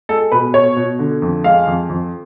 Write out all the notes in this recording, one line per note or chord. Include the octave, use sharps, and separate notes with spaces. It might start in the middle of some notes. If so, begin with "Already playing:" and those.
G#3 A4
B2 B4
B2 C#5
B2
D3
F2
G#3 F5
F2
F2